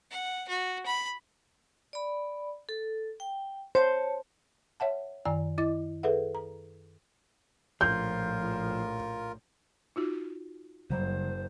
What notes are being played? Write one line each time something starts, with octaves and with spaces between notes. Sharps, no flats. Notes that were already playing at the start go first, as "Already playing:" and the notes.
F#5
F#4
B5
D5 B5
A4
G5
C5 C#5 A5
C#5 E5 F#5 A5
F#2 D#3 D5 G#5 A#5
E4 D#5 D6 A6
G#4 A4 B4 E5 F#5
A#5
A#1 A2 F3 F4 A#4 G6
D#4 F4 F#4
F#1 C#3 F#3 G3 C5